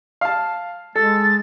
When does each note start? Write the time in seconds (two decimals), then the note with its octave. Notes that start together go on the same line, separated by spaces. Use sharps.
0.21 F5 A5
0.96 G#3 A4 A6